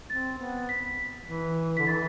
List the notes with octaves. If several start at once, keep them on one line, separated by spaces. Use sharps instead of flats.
C4 A6
B3
B6
E3
D3 B6
E3 A6